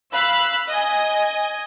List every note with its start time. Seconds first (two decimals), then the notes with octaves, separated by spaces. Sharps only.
0.12 F5 B5 E6 F#6
0.67 D#5 G#5